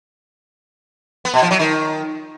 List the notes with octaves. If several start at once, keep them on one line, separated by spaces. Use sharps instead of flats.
B3
B2
F3
F#3
D#3